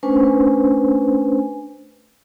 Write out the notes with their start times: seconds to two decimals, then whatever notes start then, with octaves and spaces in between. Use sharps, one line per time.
0.03 A3 C#4 D4 B4 C5 G#5